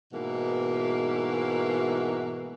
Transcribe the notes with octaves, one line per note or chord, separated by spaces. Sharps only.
G#2 B2 E3 A#3